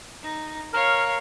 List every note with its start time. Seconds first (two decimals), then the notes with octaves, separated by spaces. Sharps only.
0.23 D#4
0.73 A#4 C#5 F5 F6